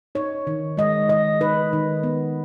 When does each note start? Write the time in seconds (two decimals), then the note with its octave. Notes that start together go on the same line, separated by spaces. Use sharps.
0.15 D#4 C#5
0.47 D#3
0.77 G#3 D#5
1.09 D#3 D#5
1.40 D#4 B4
1.73 D#3
2.03 B3